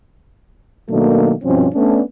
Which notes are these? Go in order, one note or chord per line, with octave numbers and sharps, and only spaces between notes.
B2 D#3 F#3 A3 A#3 D4
G2 B2 F3 C4 C#4
A3 B3 C#4 D4